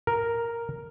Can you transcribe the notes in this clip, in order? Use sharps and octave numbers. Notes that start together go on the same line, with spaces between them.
A#4